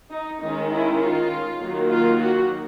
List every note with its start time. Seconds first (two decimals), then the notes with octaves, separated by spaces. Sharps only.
0.10 D#4
0.40 D#3 G#3 C#4 D#4
0.69 E4
1.00 F4
1.59 D#3 F#3 A#3
1.89 F4
2.18 F#4